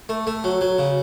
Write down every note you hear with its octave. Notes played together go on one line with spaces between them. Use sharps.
A3
A3
F#3
F#3
C#3